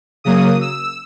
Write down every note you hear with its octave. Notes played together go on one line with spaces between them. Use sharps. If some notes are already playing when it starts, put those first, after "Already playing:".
C#3 F#3 A#3 D#6
E6